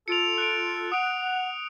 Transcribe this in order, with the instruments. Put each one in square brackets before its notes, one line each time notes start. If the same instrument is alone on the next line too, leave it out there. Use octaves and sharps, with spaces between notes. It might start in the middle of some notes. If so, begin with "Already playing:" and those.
[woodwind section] F4 A4 [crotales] C#7 D7 F7
[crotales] F#6 C#7 D7
[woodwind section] F#5 [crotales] D#6 D7